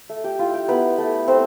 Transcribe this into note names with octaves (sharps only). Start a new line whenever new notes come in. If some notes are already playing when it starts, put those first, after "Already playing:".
A3
G4
E4 F4
G4
B3 E4 B4
A3
A3 C4 C5